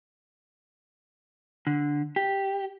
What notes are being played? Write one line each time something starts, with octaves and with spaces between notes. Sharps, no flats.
D3
G4